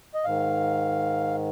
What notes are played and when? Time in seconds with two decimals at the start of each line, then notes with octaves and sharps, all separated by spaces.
0.14 D#5
0.25 G#2 D#3 F5